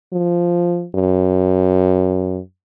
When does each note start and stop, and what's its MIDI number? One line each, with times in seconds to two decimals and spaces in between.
0.13 0.86 53
0.95 2.39 42